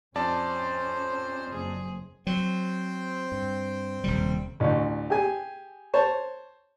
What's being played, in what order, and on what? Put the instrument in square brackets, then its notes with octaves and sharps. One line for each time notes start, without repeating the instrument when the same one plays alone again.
[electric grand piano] F2 D5 A5 [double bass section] C#4 [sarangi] C5
[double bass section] F#1 [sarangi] G#4
[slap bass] F#3 [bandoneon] C4 C5 G5
[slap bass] G2
D#1 C3 G3
[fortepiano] A1 D2
G4 G#4 G#5
C5 C#5 A5